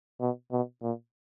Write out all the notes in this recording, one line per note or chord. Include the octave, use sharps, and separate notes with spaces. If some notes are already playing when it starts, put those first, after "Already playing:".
B2
B2
A#2